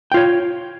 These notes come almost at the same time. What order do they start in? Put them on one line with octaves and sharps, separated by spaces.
G5 F4 C#5